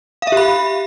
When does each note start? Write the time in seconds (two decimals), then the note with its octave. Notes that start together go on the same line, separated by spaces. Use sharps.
0.22 F5
0.27 E5
0.32 G4
0.37 B5